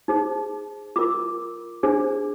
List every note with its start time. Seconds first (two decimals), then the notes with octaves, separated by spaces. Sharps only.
0.08 D#4 G#4 C5
0.96 F4 A#4 D6
1.83 D4 G#4 C5